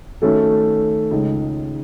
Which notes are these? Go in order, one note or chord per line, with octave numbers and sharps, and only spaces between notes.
D#3 A3 C#4 F#4 A4
C#2 C#3 G#3 D#4